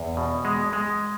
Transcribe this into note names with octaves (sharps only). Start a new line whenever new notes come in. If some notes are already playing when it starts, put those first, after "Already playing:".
Already playing: E2
B2
G#3
G#3